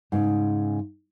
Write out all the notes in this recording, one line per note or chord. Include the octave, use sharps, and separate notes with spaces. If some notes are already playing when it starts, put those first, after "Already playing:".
G#2 C#3